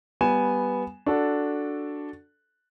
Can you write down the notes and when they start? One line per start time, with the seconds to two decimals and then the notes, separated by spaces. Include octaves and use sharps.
0.21 G3 B3 G#5 E7
1.06 D4 F#4 A4